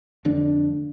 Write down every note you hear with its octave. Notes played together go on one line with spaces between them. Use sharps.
F1 F2 D3 D4